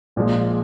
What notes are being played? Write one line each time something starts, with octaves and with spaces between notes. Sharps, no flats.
A#1 A#2 F3 G#3